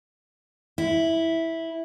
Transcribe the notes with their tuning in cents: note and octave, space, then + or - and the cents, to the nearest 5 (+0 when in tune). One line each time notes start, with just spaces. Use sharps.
E4 -5